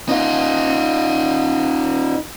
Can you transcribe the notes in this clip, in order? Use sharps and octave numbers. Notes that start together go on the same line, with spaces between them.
D#4 F4